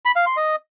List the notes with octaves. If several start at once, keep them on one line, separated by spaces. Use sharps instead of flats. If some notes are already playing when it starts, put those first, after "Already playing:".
B5
F5
C6
D#5